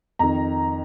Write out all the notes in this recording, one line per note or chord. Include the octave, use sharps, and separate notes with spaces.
F2 D#3 A#5